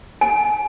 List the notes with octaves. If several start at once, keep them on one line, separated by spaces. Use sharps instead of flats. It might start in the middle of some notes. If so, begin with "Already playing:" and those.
G#5